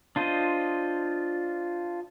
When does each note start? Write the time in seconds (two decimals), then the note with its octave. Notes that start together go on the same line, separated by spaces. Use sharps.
0.16 D4 F4 C5 D#5